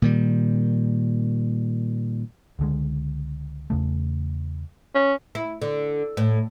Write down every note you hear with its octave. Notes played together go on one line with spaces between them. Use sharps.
A#2 D#3 G3
C#2 D3 G#3
E2 C#3 A3
C#4
E4
D3
A2